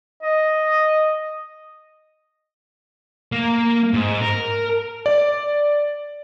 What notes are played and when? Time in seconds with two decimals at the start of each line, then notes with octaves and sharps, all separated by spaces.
0.23 D#5
3.32 A#3
3.94 G#2
4.22 A#4
5.06 D5